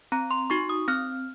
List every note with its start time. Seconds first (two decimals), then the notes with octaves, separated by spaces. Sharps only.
0.12 C4 A#5
0.31 C6
0.50 D#4 F#4 C#6
0.70 D#6
0.88 C4 F6